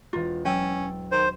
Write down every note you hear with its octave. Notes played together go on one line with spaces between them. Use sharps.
E1 F4 A#5
F#3 C#4 G5 E6 A6
D#3 C5